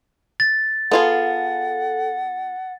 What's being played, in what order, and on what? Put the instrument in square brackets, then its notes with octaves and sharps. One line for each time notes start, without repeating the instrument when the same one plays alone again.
[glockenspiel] A6
[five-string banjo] B3 F4 G#4 [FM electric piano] A4 [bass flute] F#5